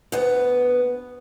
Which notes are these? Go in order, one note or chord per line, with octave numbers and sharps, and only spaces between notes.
D2 B3